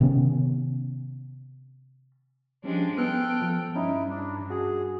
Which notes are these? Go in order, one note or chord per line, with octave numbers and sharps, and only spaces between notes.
C3 D#3 B3 C#4
F3 G3 G#3 C#4 D4 G4
B3 A4 G5 F6 F#6
F3
G2 G3 C#4 D#4 E4
D4
F#4 G#4